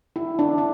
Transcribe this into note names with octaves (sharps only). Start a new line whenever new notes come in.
E4
D4
D4